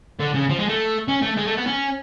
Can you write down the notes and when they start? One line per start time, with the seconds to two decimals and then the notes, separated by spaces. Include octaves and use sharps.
0.20 D3
0.34 C#3
0.50 F3
0.59 G#3
0.69 A3
1.08 C#4
1.22 A3
1.37 G#3
1.47 A3
1.57 B3
1.67 C#4